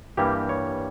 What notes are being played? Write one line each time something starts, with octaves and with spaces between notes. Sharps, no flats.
G2 E3 G3 A#3 G4
C#5